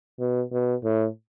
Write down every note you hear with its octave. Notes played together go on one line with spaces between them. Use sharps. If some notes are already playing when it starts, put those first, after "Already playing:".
B2
B2
A2